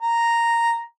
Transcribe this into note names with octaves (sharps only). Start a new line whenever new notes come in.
A#5